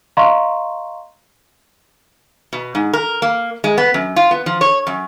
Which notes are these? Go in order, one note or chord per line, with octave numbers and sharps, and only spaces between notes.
D#5 F5 A#5 C6 C#6
B2
G#2
A#4
A#3
G#3
B3
F#2
F4
B3
F3
C#5
F#2